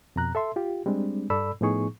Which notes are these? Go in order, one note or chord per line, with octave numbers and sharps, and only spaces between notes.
F2 B2 A#5 F#6
A4 E5 C6
F4 G4
G3 G#3 C4 D4
G2 A4 D5 B5 E6
A2 F3 B3 D#4 G#4 C#6